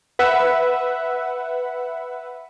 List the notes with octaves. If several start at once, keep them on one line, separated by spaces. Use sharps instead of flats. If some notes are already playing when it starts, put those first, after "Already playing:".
B4 E5 F#5